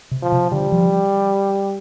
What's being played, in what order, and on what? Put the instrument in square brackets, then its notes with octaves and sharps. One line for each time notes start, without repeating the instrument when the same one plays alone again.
[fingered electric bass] C3
[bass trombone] F3
[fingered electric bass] C3
[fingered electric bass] D3 [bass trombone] G3
[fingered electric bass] F3